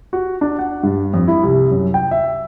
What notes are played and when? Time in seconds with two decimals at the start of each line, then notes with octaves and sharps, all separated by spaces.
0.13 F#4
0.41 D4
0.59 F#5
0.83 G2
1.14 F2
1.28 E4
1.43 C2
1.71 F#2
1.94 G5
2.11 E5